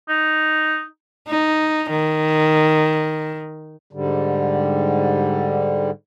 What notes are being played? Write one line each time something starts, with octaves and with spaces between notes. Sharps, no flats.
D#4
D#4
D#3
G#2 D3 G3